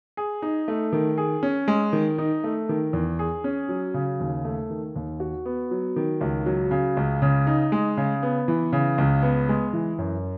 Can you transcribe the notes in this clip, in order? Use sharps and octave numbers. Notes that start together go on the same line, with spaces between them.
G#4
D#4
A3
D#3
G#4
C#4
G#3
D#3
D#4
A3
D#3
E2
G#4
C#4
F#3
C#3
D#2
A3
D#3
D#2
F#4
B3
F#3
D#3
C#2
F#3
C#3
C#2
C#3
D#4
G#3
C#3
B3
E3
C#3
C#2
B3
G#3
E3
F#2